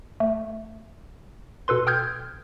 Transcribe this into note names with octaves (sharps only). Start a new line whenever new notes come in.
A3
B2 A4 B4 C6
G5 D#6 F6 G6 G#6